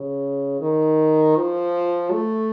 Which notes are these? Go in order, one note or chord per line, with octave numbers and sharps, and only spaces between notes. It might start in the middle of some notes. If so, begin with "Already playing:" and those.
Already playing: C#3
D#3
F3
A3